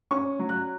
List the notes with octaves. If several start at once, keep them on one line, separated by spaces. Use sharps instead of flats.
C#4 C#6
F#3
F#6